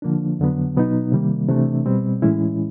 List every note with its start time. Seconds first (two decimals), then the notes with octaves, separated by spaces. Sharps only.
0.02 D3 F3 A#3 D4
0.40 F2 D3 F#3 B3
0.76 B2 F#3 B3 D#4
1.12 C3 D#3 G3 A#3
1.48 C3 E3 A3 D4
1.85 B2 G3 C4
2.22 A2 E3 G#3 C#4 E4